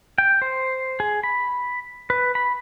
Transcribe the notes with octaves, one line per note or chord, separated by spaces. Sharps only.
G5
C5
G#4
B5
B4
B5